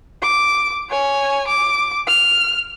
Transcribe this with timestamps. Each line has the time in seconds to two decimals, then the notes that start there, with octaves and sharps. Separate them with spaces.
0.22 D6
0.89 C#5 G#5
1.48 D6
2.07 F6